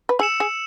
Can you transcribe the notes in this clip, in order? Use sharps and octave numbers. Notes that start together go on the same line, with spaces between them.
B4
G#4 E6 C#7 E7
G#4